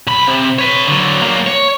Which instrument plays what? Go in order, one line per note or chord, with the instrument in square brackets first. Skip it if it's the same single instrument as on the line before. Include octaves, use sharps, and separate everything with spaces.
[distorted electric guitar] B1 B5
C3
B4 C#5
D3 F#3
F#3 A#3
C#5